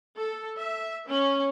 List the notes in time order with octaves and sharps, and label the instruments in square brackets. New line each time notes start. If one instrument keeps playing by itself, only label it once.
[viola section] A4
E5
C#4